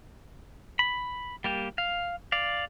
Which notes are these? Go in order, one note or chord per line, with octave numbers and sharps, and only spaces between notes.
B5
G3 A#3 G4
F5
D5 F5